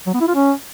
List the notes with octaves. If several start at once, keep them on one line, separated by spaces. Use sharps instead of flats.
F#3
B3
E4
F4
C#4